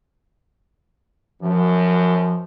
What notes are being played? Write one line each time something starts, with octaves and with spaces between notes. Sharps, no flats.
F#2 F3